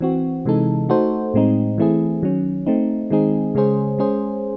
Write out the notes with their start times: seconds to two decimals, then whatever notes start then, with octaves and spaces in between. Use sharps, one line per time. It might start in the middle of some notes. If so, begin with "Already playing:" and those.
0.01 E3 C4 F#4
0.46 C3 E3 G#3 D#4 A4
0.89 A3 D#4 F#4 A4 C5
1.34 A2 G#3 C4 D#4
1.78 E3 A3 C4 E4 G#4
2.23 D#3 F#3 C#4
2.66 A3 C4 D#4
3.10 D#3 G#3 C4 D#4 G#4
3.55 C#3 G#3 C#4 G#4 C5
3.98 G#3 C#4 G#4 C5